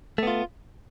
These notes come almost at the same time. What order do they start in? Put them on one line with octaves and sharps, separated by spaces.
A3 B3 F4